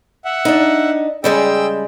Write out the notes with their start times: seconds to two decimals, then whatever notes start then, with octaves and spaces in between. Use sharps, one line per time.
0.25 E5 F#5
0.45 D4 D#4
1.24 C#3 G3 G#3 G#4 G5 E6